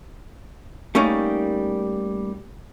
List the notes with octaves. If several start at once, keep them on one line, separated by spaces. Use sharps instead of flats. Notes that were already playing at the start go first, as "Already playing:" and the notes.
G3 A3 A#3 C#4 D#4